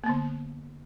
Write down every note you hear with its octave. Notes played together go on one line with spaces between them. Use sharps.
D3 A#3 B3